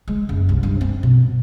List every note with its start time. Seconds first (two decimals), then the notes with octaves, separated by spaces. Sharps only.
0.08 G#3
0.29 F#1
0.49 C2
0.63 G2
0.81 C4
1.03 B2